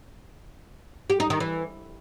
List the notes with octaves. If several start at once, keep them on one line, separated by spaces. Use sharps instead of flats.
G4
D#4
D#3
E3